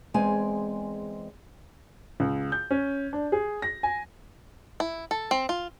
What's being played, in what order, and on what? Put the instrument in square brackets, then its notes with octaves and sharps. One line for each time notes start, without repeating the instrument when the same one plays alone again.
[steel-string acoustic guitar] E2 G#3 C4 G#5
[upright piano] C#2
G6
C#4
D4
G#4
A#6
G#5
[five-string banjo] E4
A4
C4
F4